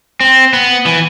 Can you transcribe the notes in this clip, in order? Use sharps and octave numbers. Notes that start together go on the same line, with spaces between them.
C4
B3
E3